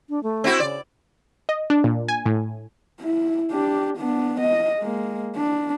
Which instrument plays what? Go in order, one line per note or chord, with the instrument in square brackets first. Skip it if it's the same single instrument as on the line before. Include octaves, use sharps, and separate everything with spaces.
[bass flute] D4
A3
[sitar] C4 E4 F#4
[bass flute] C#3 [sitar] D5
[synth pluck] D#5
D4
A#2
G#5
A2
[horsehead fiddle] E4
D4 G4
B3 D4
D#5
G#3 A#3
D4